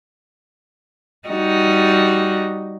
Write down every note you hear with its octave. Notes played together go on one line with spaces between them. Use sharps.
G3 D#4 F#4